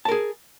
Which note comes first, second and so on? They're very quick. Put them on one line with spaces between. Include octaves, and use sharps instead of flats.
A5 A#4 G#4